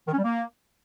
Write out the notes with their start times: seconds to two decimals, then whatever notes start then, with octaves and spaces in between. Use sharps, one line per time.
0.08 D#3
0.13 C#4
0.19 G3
0.24 A#3